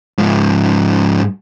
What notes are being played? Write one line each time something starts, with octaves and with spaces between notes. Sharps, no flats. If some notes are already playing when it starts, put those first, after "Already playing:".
G#2 F3